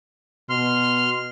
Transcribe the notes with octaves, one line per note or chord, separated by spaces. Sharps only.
B2 C6 F6